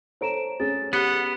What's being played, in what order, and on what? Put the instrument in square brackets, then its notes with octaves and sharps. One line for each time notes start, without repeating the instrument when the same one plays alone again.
[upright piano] A4 C#5 A#5 [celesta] C5 D7 E7
[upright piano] C#4 G#4 [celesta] A6
[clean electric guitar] B3 [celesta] G4 G7 [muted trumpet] F#5